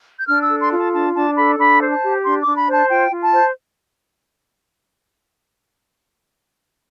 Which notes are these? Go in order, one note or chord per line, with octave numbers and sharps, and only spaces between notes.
G6
D4 F6
E6
A4
C6
F4
A5
D4 A5
D4 A5
A4 B5
D4 B5
C5
A5
G4
D4 C6
D6
D4
B5
C5
A5
F4 G5
F4
A5
C5